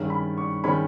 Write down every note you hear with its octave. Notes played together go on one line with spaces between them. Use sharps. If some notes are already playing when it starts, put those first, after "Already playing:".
Already playing: G2 D#3 G#3 C#4
B5
C#6
D#3 G#3 C#4 B5